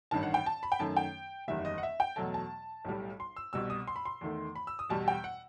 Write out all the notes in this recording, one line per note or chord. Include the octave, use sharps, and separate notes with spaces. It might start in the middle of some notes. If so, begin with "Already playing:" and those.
A1 G2 D#3 A5
F#5
G5
A5
B5
G5
F#2 D#3 A3 A5
G5
F#1 E2 D#3 G3 E5
D#5
F#5
E5
G5
E2 B2 F#3 A3 A5
A5
B1 A2 G3
C6
E6
C2 B2 G3 E6
D#6
C6
B5
C6
E2 D#3 A3
B5
E6
D#6
E2 B2 G3 A5
G5
F#5